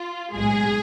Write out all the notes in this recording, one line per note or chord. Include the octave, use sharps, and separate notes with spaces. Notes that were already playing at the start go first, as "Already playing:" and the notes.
Already playing: F4
B1 A2 G#3 G#4